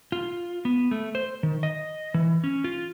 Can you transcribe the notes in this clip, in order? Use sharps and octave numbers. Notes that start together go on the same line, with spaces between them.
F4
B3
A3
C5
D#3
D#5
E3
C#4
F4